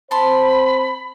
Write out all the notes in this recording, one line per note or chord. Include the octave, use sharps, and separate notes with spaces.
C4 C5 A5 B5 C6